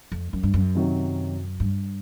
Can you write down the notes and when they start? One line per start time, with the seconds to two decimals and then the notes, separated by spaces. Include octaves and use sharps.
0.12 F2
0.33 F#2
0.43 G2
0.54 F#2
0.75 C3 D#3 F#3
1.60 G2